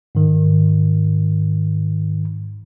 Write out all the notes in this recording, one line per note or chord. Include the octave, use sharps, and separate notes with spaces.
G#2 D#3